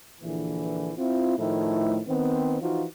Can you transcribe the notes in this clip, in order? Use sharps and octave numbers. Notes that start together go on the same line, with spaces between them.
A#1 D3 E3
C4 E4 F4
A2 D#3 F3 A3 E4
D#3 B3 C4
E3 F3 D#4 F4 F#4